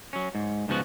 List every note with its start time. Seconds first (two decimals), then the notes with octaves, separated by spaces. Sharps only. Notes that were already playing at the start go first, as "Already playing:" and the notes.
0.13 F#3 C#4
0.35 G#2
0.68 G#2 C#3 F3 B3 F#4